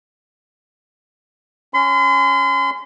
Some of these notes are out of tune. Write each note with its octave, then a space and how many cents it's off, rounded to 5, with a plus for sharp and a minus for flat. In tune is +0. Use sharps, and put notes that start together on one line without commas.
C#4 +0 C6 -40